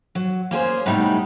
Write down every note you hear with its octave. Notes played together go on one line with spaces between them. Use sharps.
F#3
A#3 C#4 G#4 C5
A2 C3 G3 B3 D#4